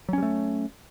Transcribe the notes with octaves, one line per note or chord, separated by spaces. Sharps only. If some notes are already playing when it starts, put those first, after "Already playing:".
F#3 G3 A3 C#4